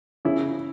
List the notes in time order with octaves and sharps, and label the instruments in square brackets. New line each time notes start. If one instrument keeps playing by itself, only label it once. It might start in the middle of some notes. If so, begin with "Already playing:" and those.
[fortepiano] C#3 E4